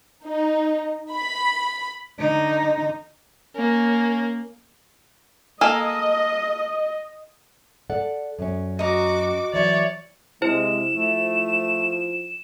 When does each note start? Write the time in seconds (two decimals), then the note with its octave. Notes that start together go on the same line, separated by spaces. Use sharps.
0.24 D#4
1.12 B5
2.19 D3 D#4
3.56 A#3 C#4
5.61 A#3 A4 D#5 G#5
7.90 A4 D5 F#5
8.39 F#2 C#4
8.79 F#4 D#5 A#5 D6
9.53 E3 F#3 C#5 D5 E5
10.42 C3 G#3 E4 C5 E7
10.93 F3 A3